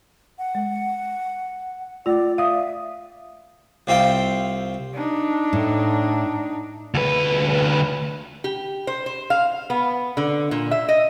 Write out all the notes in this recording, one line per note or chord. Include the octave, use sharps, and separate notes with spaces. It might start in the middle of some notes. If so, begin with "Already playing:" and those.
F#5
G#3
A3 F4 D5
E5 F5 D#6
C2 C4 F4 G5
D4 D#4
A2
D2 B4
G4
C5
C5
F5
B3
D3
A#2
E5
D#5